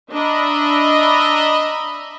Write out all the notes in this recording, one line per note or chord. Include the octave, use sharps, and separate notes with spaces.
D4 D#5 E5 A#5 B5